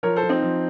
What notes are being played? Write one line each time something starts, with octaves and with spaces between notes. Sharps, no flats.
F3 A#4 C#5
A4 C5
F3
C4 D#4
F3